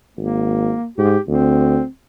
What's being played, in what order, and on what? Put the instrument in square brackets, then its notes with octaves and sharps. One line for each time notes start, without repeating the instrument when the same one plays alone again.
[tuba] G#1 [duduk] A#3
[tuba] G#2 [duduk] G4
[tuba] D2 [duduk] C4